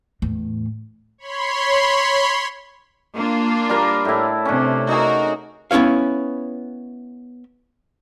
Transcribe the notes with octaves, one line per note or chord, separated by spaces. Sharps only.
E2 A2
C#5 B5 C6
A#3 D4 F4
G3 A#4 D5
A2 E4
C3 C#4 D4
D#4 F#4 G#4 A#4
B3 C#4 E4 C#5 F5